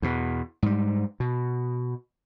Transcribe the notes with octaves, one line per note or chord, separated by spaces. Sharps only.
E2 B2
G#2 G3
B2